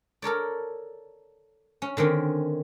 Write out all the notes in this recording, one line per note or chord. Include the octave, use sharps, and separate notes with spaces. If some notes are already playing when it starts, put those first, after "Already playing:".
A4 A#4 C#5 D5
C#4
D3 D#3 C4 C#4